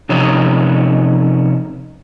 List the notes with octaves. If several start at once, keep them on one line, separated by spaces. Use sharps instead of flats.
C3 F3 C#4 D#4